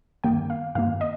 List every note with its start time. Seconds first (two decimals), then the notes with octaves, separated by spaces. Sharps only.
0.24 G2 D#3 A#3 G5
0.50 F5
0.75 G2 D#3 A#3 F5
1.01 D#5